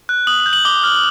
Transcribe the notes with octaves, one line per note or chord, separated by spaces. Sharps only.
F#6
D#6 F#7
F#7
G6
F#7
D6 G7
F6